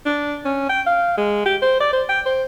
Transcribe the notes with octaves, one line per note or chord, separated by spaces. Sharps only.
D4
C#4
G5
F5
G#3
G4
C5
D5
C5
G5
C5